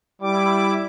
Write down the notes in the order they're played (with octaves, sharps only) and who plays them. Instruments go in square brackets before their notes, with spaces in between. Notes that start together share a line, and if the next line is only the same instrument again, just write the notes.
[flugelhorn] G3 [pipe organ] E4 D6